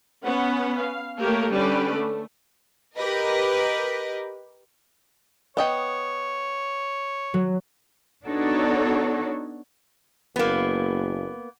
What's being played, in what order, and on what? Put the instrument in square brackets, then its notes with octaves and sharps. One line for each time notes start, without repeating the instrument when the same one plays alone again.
[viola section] B3 C#4 B4 F#5
F5
A3 A#3 G4 A#4 C#5
D3 G3 C#4 B4 D5
A3
[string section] G4 A#4 B4 D#5
[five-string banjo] B3 D#5 G5 [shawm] C#5
[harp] F#3
[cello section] B3 D4 D#4 F#4 A4 C#5
[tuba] F#1 [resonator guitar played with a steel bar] A#3 B3